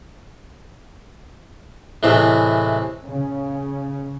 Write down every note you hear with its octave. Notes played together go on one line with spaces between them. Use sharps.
A2 C3 E3 G#3
C#3